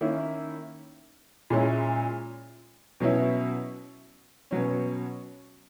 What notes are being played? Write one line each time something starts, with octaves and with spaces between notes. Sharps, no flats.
D#3 A#3 C#4 E4
A#2 G#3 C#4 E4
B2 F#3 C#4 E4
B2 F#3 C#4